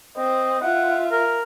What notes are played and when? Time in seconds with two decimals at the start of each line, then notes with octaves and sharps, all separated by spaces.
0.17 C4 D#5
0.62 F4 E5 F#5
1.12 A#4